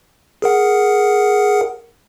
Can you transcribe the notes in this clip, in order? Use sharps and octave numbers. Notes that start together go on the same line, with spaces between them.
G#4 A#4 F#5